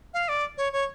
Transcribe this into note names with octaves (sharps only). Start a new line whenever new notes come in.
F5
D5
C#5
C#5